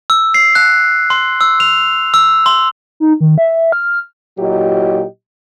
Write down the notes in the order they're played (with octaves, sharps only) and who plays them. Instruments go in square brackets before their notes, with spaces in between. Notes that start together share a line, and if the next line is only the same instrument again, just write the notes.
[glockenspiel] E6
C7
F#6
C6
E6
F7
E6
C6
[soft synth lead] D#4
D#3
E5
F6
[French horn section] A#2 F#3 E4 G4 D#5